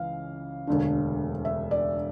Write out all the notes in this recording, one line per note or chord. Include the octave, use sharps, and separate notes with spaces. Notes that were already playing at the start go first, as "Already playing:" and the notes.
Already playing: C#2 C#3 E3 F5
E1 D2 D3
E5
D5